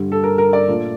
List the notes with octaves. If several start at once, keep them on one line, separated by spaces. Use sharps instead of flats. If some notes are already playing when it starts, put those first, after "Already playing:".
Already playing: G2 D3 G3
A4
A#4
A#4
D5
A#2 A3 D4 F4